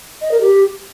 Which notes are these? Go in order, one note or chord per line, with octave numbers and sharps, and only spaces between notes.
D#5
A#4
G4